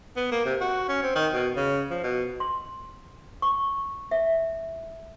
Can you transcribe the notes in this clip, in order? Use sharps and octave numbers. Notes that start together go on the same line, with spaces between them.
B3
A#3
C3
F#4
C#4
C4
D#3
B2
C#3
F3
B2
C6
C#6
E5